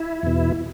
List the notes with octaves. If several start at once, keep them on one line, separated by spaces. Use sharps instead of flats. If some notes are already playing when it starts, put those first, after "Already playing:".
Already playing: E4
E2 B2